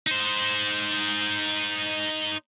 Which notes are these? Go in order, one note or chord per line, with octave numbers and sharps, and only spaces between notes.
D#4 C5